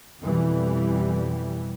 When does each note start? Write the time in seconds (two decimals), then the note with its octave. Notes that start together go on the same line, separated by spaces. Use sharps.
0.22 F2 B2 E3 G3